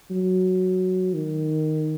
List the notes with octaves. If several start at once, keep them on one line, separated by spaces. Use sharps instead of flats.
F#3
D#3